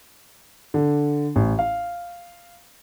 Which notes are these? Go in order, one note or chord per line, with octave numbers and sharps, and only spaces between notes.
D3
A1
F5